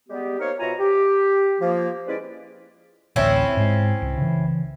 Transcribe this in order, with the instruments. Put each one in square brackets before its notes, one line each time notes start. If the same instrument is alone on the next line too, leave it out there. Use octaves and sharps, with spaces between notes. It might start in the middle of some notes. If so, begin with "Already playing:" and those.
[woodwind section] G3 G#3 B3 G4
A#3 D#4 A#4 C5 C#5
B2 F4 C#5 E5 G#5 A#5
G4
F3 A#3
G#3 C4 C#4 E4 B4 D5
[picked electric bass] A1 D2 A2 [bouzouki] C4 C#4 E4
[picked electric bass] G#2 G#3
C2
C#3 E3